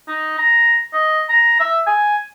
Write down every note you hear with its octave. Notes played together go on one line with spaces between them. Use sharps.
D#4
A#5
D#5
A#5
E5
G#5